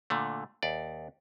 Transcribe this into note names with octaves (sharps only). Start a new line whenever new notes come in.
A#2 D3 A3
D#2 D5